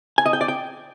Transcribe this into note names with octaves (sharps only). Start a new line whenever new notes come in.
G#5
D#5
G5
D5
G5